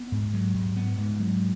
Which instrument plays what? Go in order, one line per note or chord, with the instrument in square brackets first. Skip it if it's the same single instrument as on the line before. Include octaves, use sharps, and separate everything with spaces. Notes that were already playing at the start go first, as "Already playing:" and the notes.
Already playing: [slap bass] B3
G#2
F#3
G#2
B3
G#2
F#3